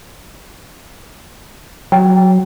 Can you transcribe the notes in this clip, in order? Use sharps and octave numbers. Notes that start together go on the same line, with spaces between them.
F#3 G5